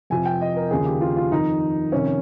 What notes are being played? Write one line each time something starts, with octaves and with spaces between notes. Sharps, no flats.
F2 C3 F3 G#5
G5
D#5
A#4
D#2 C#3 F3 G#4
G4
F4
F4
F2 D#3 D#4
F2 C3 D#3 C#4